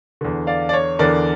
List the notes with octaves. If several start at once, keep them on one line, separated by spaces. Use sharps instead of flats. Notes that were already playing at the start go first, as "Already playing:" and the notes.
E2 D3
D5 F5
D5
C#5
E2 D3 A#4 D5